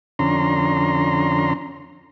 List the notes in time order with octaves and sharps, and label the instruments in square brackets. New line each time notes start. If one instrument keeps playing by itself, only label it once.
[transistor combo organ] F2 D3 C#4 A#5 C6